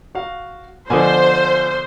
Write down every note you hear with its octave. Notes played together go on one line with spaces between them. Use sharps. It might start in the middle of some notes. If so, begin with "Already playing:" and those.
F#4 F5
B2 D3 F3 A4 C5 G#5